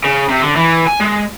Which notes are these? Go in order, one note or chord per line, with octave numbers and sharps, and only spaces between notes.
C#3
C3
D3
E3
G#5
G#3